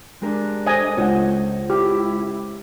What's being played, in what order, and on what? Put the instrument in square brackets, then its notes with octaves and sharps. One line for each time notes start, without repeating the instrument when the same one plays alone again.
[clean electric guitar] G#3 G4 A#4 [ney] D4
[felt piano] A4 C5 [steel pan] D#5 G#5
[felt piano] C#2 F#5 [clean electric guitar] C5 C#5
[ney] E4 [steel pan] G4